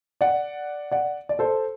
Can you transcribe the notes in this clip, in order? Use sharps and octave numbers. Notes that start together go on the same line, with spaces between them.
D5 F#5
D5 F#5
D5
A4 C5